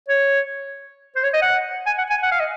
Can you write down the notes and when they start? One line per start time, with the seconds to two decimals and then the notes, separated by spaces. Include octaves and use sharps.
0.09 C#5
1.16 C5
1.24 C#5
1.33 D#5
1.42 F#5
1.86 G#5
1.98 F#5
2.10 G#5
2.23 F#5
2.32 F5
2.40 D#5